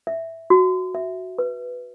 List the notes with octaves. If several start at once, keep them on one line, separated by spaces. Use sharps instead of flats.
E5
F#4
E5
B4